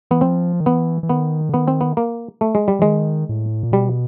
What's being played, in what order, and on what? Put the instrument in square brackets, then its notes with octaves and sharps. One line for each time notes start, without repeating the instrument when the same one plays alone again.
[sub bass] E3 [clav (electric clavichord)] B3
[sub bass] F3 [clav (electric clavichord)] C4
[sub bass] D#3
[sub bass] E3 [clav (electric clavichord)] B3
[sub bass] E3
[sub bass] D#3 [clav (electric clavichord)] B3
[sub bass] D3
[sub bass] D#3 [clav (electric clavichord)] B3
[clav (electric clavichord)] C4
B3
A#3
A3
G#3
G3
[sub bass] E3
[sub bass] D#3 [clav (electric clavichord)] G#3
[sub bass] A2
A#2
[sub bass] B2 [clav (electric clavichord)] G3